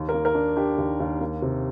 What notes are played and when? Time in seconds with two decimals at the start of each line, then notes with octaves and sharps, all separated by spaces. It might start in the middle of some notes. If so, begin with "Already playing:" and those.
Already playing: D#2
0.09 A#4
0.14 A#3
0.25 A#4
0.35 D4
0.56 D4 G4
0.78 D#2
1.00 D#2
1.21 A#3
1.42 C3